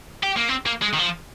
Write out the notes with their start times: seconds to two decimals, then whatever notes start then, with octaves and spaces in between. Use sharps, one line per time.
0.23 G4
0.37 A#3
0.49 C4
0.66 A#3
0.82 G#3
0.94 D#3
0.99 F3